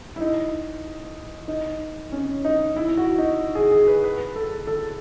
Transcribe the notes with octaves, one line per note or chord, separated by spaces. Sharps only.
E4
D#4
D#4
C#4
D#4
E4
F#4
D#4
G#4
G#4
B4
B4
A4
A4